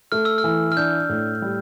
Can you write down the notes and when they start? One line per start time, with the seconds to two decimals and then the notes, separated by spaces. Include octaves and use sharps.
0.12 A3 F6
0.25 E6
0.38 F6
0.44 E3
0.72 F6
0.77 D4 G6
1.09 A2
1.42 G3